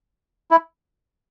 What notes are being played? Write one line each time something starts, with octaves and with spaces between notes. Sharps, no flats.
E4